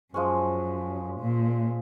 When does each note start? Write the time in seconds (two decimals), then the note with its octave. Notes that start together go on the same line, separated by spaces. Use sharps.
0.14 F#2 F3 G#3 C#4
1.20 A#2